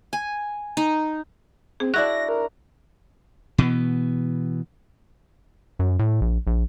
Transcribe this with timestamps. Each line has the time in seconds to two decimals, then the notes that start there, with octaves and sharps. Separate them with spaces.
0.13 G#5
0.77 D#4
1.80 C4 G#4
1.94 D4 E4 F#4 F#6 A#6
2.29 A#4
3.58 B2 E3 B3
5.79 F#2
5.99 A2
6.21 A#1
6.47 A#1